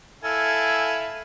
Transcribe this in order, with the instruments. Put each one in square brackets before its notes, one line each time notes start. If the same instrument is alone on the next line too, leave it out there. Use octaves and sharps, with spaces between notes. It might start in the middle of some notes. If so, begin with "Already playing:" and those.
[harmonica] E4 A4 F5 [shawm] G#5